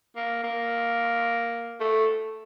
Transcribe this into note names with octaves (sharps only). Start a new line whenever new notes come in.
A#3
A#3
A3